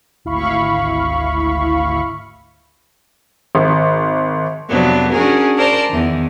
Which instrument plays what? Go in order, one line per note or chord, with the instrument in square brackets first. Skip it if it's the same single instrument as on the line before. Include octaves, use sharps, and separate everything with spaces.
[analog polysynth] G#1 D2 E4 F5 B5 C#6
[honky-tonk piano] G#1
[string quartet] F2 C3 F#3 B3 D4
C#4 D4 F#4 G#4 A#4
A#4 C5 D5 A5 A#5 C6
E2 D#3